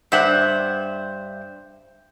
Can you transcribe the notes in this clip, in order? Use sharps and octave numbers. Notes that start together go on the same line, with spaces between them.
G2 C5 E5 F#5